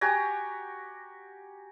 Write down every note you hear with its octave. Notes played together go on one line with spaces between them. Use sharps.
F#4 G4 G#5 A#5